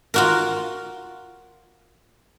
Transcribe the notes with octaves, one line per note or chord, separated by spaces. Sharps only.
F4 F#4 A#4